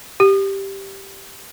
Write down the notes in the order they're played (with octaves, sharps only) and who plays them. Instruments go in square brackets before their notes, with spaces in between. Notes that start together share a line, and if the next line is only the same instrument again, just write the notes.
[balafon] G4